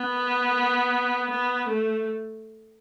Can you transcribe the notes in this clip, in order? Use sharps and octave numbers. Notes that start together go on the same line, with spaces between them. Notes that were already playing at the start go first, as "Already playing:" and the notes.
Already playing: B3
B3
A3